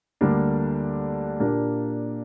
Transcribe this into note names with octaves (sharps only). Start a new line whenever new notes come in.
D2 D3 G3 A#3 D4
A#2 A#3 D4 G4